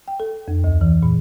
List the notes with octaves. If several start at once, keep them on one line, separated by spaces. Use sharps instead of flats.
G5
A4
F2
D2
E3
A#2